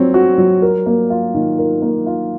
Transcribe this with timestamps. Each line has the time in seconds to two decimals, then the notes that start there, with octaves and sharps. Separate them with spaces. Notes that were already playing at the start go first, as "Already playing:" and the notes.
Already playing: F#3 C4 C#5
0.14 F#4
0.38 F#3
0.62 A#4
0.86 A#3
1.10 F4
1.34 D#3
1.59 A#4
1.82 A#3
2.06 F4